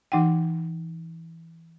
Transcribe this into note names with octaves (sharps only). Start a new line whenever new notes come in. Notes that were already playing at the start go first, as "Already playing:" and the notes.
E3 D#4 F#5 G5